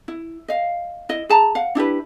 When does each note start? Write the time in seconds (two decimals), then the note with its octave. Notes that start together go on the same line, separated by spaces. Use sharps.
0.08 E4
0.48 D#5 F5
1.09 E4 D#5
1.29 G#4 A5 A#5
1.55 F5 F#5
1.75 D4 E4 G4 B4